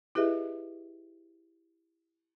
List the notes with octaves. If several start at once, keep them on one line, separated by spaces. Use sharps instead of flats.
E4 G4 G#4 B4 D#5 E5